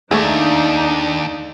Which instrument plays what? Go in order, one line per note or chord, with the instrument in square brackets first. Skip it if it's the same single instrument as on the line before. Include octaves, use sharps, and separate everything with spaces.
[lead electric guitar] D#2 [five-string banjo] A3 G#4 [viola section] D4 D#4